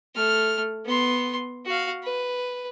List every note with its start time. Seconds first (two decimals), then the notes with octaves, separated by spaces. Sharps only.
0.15 A3 F6
0.85 B3 C6
1.66 F#4 F5
2.03 B4